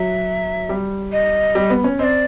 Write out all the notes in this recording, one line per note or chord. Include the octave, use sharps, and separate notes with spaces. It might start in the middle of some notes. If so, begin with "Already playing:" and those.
Already playing: F#3 E5
G3
D#5
G3
B3
C#4
C4 D5 D#5